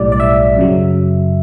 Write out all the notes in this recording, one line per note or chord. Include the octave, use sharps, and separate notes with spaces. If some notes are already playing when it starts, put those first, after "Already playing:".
Already playing: B1 A2 G3 D5
D5
E5
F#2 C#3 F#3